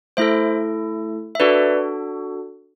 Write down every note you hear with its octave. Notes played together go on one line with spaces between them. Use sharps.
A3 E4 A4 C5 E5
E5
D4 F#4 A4 B4 D5